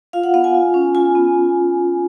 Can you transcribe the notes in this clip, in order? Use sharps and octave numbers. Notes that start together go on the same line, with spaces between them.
F4 F5
F#5
B3 F5
G#5
F4
C#4
F4 G#5
B3